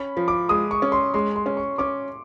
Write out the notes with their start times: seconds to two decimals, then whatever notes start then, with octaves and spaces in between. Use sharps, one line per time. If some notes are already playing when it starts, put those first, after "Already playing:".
Already playing: C#4 B5
0.17 F3
0.28 D6
0.49 G#3 D#6
0.71 C#6
0.82 C#4
0.92 C6
1.14 G#3 C6
1.36 C6
1.46 C#4
1.57 C#6
1.78 C#4 D6